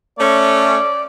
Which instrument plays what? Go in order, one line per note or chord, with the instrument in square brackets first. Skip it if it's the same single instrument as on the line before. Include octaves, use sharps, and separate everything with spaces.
[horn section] A3 C#4 [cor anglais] D5